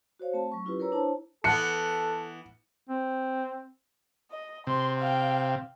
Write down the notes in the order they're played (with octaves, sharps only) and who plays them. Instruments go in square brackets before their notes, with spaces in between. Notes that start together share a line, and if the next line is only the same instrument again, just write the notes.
[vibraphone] F#4 C5 C#5 F5
A3 C4 A5
F#3 C#6
C#4 E4 F4 G4 B4
A#4 B4 C#5 A#5 E6
D4 E4 C5 C#5 A5
[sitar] E3 B3 [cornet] A4 [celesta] A5 F#6 [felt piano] C#7
[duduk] C4
[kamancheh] D#5
[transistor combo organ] C3 [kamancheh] C6
[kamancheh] F5 G5